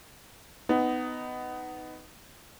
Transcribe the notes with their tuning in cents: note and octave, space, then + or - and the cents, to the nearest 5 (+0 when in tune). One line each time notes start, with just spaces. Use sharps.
B3 +20 D#4 +0